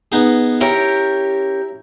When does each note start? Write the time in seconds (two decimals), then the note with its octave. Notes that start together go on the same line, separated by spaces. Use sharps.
0.12 B3 D#4 G#4
0.61 C#4 E4 G4 A#4